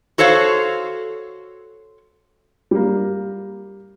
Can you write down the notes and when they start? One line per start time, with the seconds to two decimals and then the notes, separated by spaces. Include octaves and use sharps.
0.18 F#4 A4 C5 C#5 F5
2.71 G3 A#3